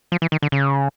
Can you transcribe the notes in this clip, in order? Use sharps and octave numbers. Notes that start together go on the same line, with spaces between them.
F3
E3
D#3
D3
C#3